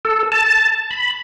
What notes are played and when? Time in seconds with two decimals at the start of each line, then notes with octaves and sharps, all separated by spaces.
0.05 A4
0.32 A5
0.91 B5